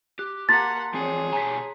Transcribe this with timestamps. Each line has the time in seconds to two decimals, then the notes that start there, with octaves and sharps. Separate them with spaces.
0.19 G4 F#6
0.49 A#3 F#5 A5 C6 A6 B6
0.94 E3 F3 C4 G#4 C#5
1.33 B2 G4 G#5 A#5 B6